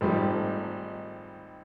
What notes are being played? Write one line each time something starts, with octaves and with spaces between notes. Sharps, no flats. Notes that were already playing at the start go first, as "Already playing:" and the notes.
G#1 F3 G3 A3 D#4